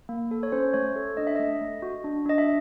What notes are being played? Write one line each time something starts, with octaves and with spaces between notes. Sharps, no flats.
A#3
A4
C#5
C#4 C5
A3 C#5
A4
D4 D#5
E5
A3 D#5
A3
F#4
D4
D4 D#5
E5